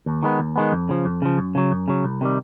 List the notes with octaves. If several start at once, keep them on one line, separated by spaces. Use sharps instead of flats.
D#2
D#3 G#3 B3
D#2
D#3 G#3 B3
F2
C#3 F3
F2
C#3 F3
F#2
C#3 F#3
F#2
C#3 F#3
C2
C3 D#3 G3